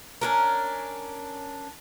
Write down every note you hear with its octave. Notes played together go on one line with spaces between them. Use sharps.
C#4 D4 A#4